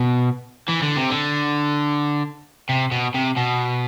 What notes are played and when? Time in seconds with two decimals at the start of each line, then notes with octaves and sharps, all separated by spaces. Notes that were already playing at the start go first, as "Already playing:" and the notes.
Already playing: B2
0.69 E3
0.83 D3
0.97 C3
1.11 D3
2.69 C3
2.91 B2
3.14 C3
3.36 B2